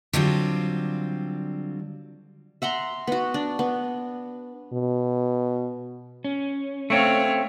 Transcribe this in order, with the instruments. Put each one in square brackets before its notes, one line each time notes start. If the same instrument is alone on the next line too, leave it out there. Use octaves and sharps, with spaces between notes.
[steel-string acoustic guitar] D3 F#3 G3 C4 F4
[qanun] E5 F#5 A#5 C6
B3 F#4
D4
B3
[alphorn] B2
[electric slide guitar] C#4
[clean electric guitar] A3 C4 [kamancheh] C#5 F5